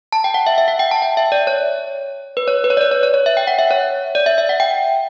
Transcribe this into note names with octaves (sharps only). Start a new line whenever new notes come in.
A5
G5
F#5
E5
E5
F#5
G5
A5
G5
E5
D5
C#5
B4
C#5
B4
C#5
D5
C#5
C#5
C#5
C#5
E5
G5
F#5
E5
C#5
D5
E5
E5
F#5
G5